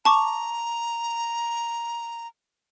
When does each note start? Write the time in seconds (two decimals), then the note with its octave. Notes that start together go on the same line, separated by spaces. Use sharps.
0.05 A5 A#5 C#6 D6